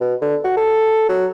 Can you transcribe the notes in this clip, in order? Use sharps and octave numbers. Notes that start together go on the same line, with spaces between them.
B2
D3
F#4
A4
F#3